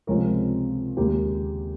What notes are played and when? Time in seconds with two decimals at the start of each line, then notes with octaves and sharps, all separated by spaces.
0.07 C#2 C3 F3 G#3 C4 A#4 C#5
0.97 D#2 C#3 G#3 G4 A#4